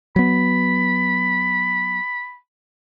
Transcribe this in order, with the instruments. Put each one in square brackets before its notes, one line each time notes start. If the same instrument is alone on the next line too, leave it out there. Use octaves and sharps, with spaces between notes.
[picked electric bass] F#3 B3 [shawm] B5